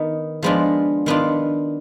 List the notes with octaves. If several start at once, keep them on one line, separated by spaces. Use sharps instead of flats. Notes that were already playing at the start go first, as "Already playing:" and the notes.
Already playing: D#3 B3 D#4
F3 G#3 B3 D4 F4
D#3 B3 D4 F4